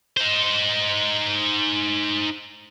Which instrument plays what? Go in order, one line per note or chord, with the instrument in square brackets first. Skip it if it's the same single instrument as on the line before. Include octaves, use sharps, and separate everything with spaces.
[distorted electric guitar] D#4 C5